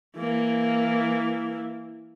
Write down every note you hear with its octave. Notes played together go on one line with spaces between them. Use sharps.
E3 A#3